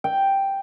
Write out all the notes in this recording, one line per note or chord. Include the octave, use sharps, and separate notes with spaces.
G5